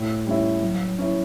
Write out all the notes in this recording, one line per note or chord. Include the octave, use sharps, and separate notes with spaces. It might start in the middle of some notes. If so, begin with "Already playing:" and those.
Already playing: A2
G3 C#4 E4
F#3
C#4 E4